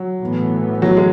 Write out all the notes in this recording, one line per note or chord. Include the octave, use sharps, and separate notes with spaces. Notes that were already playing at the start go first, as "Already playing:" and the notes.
Already playing: F#3
A2 E3 B3
F#3
G#3